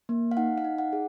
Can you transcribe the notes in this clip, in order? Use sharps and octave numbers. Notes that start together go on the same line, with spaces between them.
A#3
F5
D#4 F#5
F5
D#4
F#5
G#4